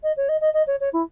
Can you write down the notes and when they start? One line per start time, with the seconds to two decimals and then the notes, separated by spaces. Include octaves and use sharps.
0.03 D#5
0.16 C#5
0.28 D#5
0.41 D#5
0.53 D#5
0.67 C#5
0.80 C#5
0.93 E4